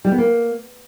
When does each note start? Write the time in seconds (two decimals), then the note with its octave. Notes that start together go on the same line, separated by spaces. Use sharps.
0.05 G3
0.11 B3
0.18 A#3